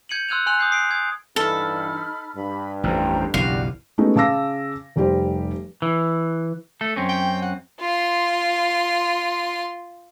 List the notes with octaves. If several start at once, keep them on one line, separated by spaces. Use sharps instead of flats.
G6 G#6 C#7 D#7 F#7
C6 E6 F#6 G#6 D#7 F7
G#5 C6 F#6 C#7 F7
D#6 G6 C7
D#6 C7 D7
D#6 G#6
G2 E3 D#4 A4 B5 F6
G2 B5
A1 F2 A2 C5 G5 A#5
F#1 B1 E3 F#4 G4 D5 F5
G#3 A3 B3 C#4 D#4 F#4
C#3 A5 D6 E6 A#6
F1 G3 G4 C5
E3
A3 A4
F#2 C4 C#4
G5
F#5
F4 C6